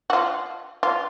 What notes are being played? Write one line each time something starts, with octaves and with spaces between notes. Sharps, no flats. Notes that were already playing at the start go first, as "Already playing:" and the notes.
F#4
F4
F4